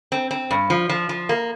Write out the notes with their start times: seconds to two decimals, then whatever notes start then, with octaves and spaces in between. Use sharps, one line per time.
0.12 C4
0.31 C4
0.51 G2
0.70 F3
0.89 F3
1.09 F3
1.29 A#3